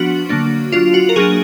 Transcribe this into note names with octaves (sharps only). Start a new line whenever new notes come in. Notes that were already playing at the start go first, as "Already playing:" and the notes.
Already playing: F3 B3 D4 F#4
D3 F#3 A#3 D4
F#3 D4 F4
F#4
A#4
F#3 A#3 D4 G#4